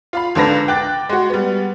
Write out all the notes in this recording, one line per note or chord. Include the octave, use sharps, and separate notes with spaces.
F4 F5 B5
C#2 D3 D4 B4 A#6
G5 D6 F#6 A6
G#3 F#4
G3 B3